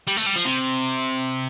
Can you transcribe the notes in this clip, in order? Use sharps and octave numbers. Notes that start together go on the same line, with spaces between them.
G3
A3
G3
F3
C3